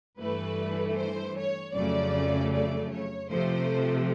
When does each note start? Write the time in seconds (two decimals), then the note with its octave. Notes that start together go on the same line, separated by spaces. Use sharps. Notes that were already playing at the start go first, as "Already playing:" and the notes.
0.20 G2 E3 A3 B4
0.97 C5
1.36 C#5
1.75 F2 C#3 F#3 A3 D5
2.53 D5
2.91 C#5
3.30 C3 F3 A3 C5